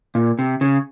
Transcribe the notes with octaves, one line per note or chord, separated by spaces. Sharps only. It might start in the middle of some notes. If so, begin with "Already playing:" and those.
A#2
C3
C#3